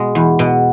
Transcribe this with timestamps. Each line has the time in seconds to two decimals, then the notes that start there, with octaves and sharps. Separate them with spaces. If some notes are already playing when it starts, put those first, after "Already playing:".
Already playing: B2 G#3
0.15 E2
0.39 B2